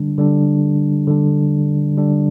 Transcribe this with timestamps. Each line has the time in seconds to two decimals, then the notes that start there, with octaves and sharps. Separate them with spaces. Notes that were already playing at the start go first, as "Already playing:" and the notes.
Already playing: D3 G3 D4
0.18 D3 G3 D4
1.07 D3 G3 D4
1.97 D3 G3 D4